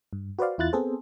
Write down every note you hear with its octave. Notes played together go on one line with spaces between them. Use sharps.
G2
F#4 B4 C5 D5 F5
E2 E4 F4 F#6 A6
B3 C4 G#4 A4 C5